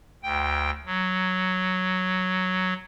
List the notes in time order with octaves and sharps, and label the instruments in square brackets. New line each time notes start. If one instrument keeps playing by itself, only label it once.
[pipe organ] D2 G5
F#3